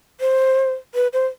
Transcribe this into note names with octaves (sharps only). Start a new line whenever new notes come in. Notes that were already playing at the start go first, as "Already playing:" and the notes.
C5
B4
C5